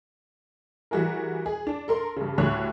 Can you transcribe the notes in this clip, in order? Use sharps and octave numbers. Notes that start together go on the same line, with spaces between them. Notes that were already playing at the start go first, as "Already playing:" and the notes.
E3 G3 F#4 G#4 A#4
G#4
D4
A4 A#4 C6
G2 C#3
D2 A2 D3 G3 C#5 F#6